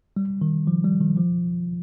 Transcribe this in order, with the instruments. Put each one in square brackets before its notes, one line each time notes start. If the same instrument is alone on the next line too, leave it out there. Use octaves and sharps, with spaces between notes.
[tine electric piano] G3
D#3
F3
G3
D#3
F3